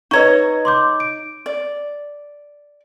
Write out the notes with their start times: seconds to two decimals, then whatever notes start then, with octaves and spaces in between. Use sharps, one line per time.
0.11 D#4 B4 C#5 D#5 A#5 C#6
0.65 C6 D6 G6
1.00 D7
1.46 D5